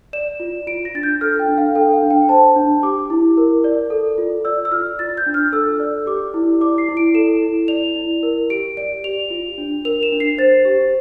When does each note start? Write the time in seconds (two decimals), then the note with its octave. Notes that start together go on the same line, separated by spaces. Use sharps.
0.13 D5 E7
0.40 F4
0.67 F4 D7
0.85 A#6
0.95 D4 A6
1.03 G6
1.21 A4 F6
1.39 G5
1.48 D4
1.58 F5
1.75 A4 G5
1.93 F5
2.03 D4
2.10 G5
2.29 C5 A5
2.56 D4
2.83 G4 D6
3.10 E4
3.37 A#4
3.64 D5
3.90 A4
4.18 F4
4.45 D5 E6
4.65 E6
4.72 F4 F6
4.99 F4 A6
5.17 G6
5.26 D4
5.34 F6
5.52 A4 E6
5.80 D5
6.06 G4 D6
6.34 E4
6.61 D5 D6
6.78 C7
6.88 E4
6.97 D7
7.14 A4 E7
7.42 E4
7.68 D5 F7
7.96 E4
8.23 A#4
8.50 G4 D7
8.77 D5 D7
9.04 G4 F7
9.30 F4
9.58 D4
9.85 A#4 F7
10.03 E7
10.12 D4
10.20 C7
10.38 C5 A6
10.65 G4